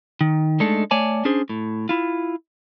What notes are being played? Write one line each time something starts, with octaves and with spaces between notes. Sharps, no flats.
D#3
G#3 A3 D4 D#4 A4
A3 C#5 D5 G#5 A5
C#4 D4 G#4 C5
A2
E4 F4